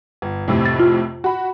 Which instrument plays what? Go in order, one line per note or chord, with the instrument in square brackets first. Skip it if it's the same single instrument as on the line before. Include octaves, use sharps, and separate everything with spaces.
[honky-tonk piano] G1
F2 A2 C3
[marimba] A6
F4
[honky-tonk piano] F#4 B5